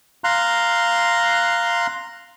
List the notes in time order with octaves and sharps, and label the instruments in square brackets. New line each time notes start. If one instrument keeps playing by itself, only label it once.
[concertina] F5 A#5 C6 F#6